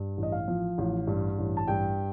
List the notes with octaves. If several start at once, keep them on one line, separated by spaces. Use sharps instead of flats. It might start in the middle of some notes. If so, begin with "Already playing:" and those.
Already playing: G2
A1
D#5
F5
F3
A1
G2
A1
A5
G2 G5